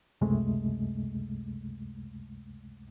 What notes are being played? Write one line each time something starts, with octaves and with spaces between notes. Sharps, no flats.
C#2 F#2 C3 G#3 A3